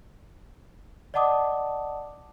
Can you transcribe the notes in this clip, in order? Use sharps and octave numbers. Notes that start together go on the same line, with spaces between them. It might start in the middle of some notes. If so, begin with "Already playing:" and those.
D5 D#5 F#5 A5 D6 D#6